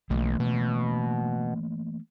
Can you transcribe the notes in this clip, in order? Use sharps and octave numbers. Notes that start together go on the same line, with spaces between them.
B1 E3 A3 A#3
B2